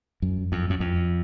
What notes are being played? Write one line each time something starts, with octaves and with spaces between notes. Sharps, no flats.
F#2
F2
F#2
F2